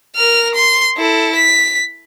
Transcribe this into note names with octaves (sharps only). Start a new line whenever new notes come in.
A#4 F6
C6
E4 A4
B6